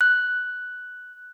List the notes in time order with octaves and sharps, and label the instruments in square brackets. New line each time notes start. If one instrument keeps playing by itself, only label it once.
[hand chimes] F#6